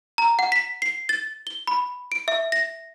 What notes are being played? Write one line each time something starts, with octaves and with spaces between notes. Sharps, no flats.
A#5
F#5
B6
C7
A6
G7
B5
D7
E5
A#6